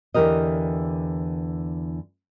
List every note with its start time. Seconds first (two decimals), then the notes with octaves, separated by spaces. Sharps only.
0.14 E2 D3 E3 G4 A#4 D#5